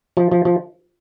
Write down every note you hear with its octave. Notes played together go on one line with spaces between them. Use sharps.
F3
F3
F3